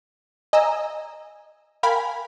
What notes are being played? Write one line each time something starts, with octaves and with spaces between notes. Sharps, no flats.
D#5 G#5 A#5 E6
A#4 F5 G5 G#5 B5